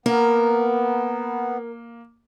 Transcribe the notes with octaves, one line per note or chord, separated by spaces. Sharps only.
A#3 B3 A#4